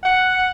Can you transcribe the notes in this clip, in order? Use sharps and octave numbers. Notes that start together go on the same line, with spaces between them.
F#5